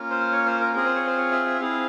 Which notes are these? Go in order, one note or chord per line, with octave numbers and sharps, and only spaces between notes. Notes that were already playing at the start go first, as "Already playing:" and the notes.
Already playing: A#3 C#4 F4
C5
C#5
C5
A#4
C4 F4 G#4 A#4
C5
C#5
C5
C#5
E5
E5
C4 E4 G#4 F5